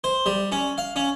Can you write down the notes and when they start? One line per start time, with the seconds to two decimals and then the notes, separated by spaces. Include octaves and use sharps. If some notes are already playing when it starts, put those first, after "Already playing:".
0.04 C5
0.26 G3
0.52 C#4
0.78 F5
0.96 C#4